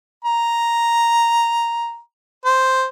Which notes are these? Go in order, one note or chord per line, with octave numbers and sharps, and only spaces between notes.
A#5
C5